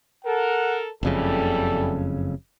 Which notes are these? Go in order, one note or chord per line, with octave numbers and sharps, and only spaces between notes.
A4 A#4 F#5
F#1 F2 C#3 E3 G3 A4